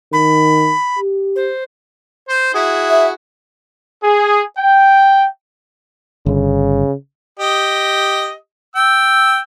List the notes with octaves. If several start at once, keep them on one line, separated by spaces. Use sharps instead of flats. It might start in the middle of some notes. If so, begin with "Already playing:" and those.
D#3 B5
G4
C5
C5
E4 F#4 G#4
E5
G#4
G5
G1 C#3
G4 D#5
G5 E6